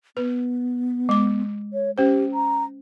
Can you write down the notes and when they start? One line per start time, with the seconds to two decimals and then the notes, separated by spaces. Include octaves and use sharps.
0.17 B3 B4
1.09 G#3 D6
1.73 C#5
1.98 C#4 G4 C5
2.34 A#5